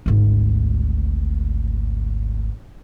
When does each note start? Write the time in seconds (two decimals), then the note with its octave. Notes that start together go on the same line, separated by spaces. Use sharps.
0.06 G#1 D2